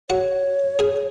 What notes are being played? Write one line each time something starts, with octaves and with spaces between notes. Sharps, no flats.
F#4 C#5 F#5
G#4 G#5